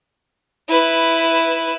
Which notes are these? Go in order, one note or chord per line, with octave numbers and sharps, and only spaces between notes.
E4 B4